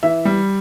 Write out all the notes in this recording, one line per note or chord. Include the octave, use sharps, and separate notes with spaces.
E3 E5
G3